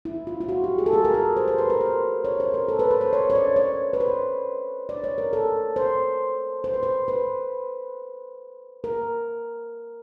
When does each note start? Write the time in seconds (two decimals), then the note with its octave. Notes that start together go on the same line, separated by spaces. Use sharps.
0.05 E4
0.27 F4
0.41 F4
0.49 F#4
0.64 G4
0.78 G#4
0.86 A4
0.93 G#4
1.05 A#4
1.14 A4
1.37 C5
1.48 C5
1.58 B4
1.70 A#4
1.81 C5
2.24 C#5
2.40 C5
2.54 A#4
2.68 A4
2.79 B4
2.91 B4
3.01 C5
3.13 C#5
3.30 C#5
3.35 D5
3.56 C#5
3.93 B4
4.00 C5
4.89 D5
5.04 C#5
5.18 A#4
5.33 A4
5.76 C5
6.64 C5
6.74 B4
6.83 C5
7.08 B4
8.84 A#4